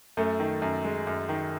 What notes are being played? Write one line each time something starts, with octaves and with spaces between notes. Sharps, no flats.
F#2 A3 A4
D#3
F#2
G#3
F#2
D#3